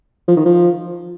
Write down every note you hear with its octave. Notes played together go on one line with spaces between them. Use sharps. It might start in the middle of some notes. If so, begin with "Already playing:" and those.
F3
D#3
F3